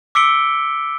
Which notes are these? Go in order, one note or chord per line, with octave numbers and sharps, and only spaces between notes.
D6 E6 B6 C#7 D7 G7